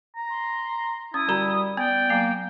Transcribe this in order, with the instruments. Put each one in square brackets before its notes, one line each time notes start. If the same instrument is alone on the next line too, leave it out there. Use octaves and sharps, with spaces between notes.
[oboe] A#5
[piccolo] C6
[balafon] C#4 [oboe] E4 [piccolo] D#6
[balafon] D3 F#4 A#5 [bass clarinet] G3
[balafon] B3 [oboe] D5 [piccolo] G5
[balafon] F#3 G#5 [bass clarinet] A#3